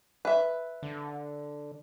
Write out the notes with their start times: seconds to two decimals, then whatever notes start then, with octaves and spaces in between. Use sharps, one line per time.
0.25 B4 E5
0.83 D3